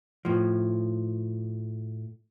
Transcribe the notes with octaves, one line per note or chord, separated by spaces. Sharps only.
A2 F3